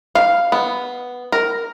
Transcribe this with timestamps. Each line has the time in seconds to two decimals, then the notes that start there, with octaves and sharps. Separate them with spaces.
0.15 F5
0.52 B3
1.32 A#4